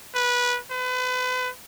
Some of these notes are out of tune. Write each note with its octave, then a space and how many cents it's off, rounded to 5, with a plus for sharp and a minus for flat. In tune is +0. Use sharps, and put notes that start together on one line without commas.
B4 -15
B4 +35